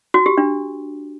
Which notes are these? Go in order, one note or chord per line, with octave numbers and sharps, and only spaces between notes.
F#4
G4
D4